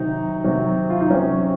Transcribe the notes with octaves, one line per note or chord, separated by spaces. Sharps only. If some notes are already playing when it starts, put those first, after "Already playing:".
Already playing: C3 D#3 F#3 D#4
C3 D#3 F#3
F4
D#4
C3 F#3 C#4